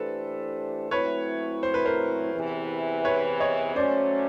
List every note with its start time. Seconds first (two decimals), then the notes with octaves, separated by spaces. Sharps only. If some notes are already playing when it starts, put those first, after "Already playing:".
Already playing: E3 A3 D4 G4 A4 B4 C5
0.91 F#3 A3 C4 E4 B4 C#5
1.63 C5
1.74 B4
1.85 A#4 C5
2.34 E2 C3 E3
3.05 B4 C#5
3.40 C#5 D#5
3.75 F#3 A3 C#4 C5 D5